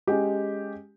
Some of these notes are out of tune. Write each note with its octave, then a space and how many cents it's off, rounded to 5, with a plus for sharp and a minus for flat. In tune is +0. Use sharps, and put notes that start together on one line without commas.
G#3 +0 C#4 +0 G4 +0